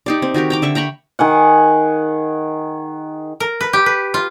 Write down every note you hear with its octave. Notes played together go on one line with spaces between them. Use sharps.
D#4 G4 D5
C4
D#3 F#4 G4 A#4
G5 A#5 D6
D3 E5 C#6
G5 A#5 B5 C#6
D#3 G#4 F#5
A#4
B4
G4
B4
F4